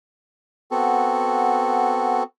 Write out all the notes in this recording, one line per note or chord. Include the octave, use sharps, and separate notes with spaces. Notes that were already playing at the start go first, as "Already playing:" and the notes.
B3 C4 F#4 A4